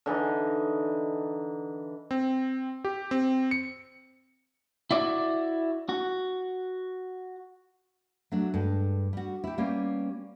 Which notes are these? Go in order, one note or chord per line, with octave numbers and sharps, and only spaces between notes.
D3 E3 D#4
C4
G4
C4
C#7
E4 F#4 D5
F#4
F#3 A3 D4
G2 G#3 A4
G3 F#4
E4 G4
G3 A#3 B3 C#4 G4